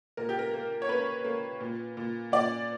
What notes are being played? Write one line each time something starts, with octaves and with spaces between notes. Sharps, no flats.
A#2 A#4
G4
A#4
A#3
C#5
A#3 B4
A#3
A#2
A#2
A#2 D5